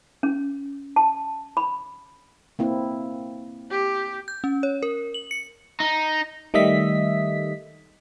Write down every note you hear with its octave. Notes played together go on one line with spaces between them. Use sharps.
C#4
A5
B5
A#3 C4 E4
G4
G6
C#4
C#5
A#4
F#7
C#7
D#4
D#3 G3 A3 D#5 E5 B6